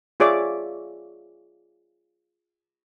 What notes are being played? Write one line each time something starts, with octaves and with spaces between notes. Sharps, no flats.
F4 G#4 C#5 D5 E5 D6